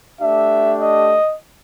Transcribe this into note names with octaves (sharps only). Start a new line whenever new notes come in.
A3 D4 G4 E5
D#5